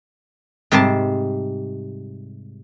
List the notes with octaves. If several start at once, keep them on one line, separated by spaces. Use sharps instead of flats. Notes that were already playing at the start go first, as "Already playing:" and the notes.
G#2 C3 G3 C5 A5 C6